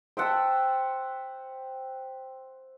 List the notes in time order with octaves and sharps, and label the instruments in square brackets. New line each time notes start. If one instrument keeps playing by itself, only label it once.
[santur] C5 E5 F#5 [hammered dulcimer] G5 A5